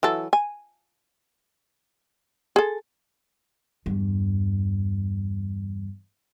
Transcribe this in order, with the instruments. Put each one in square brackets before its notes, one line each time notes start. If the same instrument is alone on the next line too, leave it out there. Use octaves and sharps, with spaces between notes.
[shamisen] E3 F#3 A4
G#5
G#4 A4
[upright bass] E2 G2